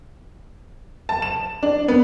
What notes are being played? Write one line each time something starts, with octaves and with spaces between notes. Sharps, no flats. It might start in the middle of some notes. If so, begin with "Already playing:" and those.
A5
E7
D4
B3